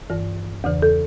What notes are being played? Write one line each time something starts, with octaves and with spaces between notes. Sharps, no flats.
G2 E3
E2 C#3 E3
A4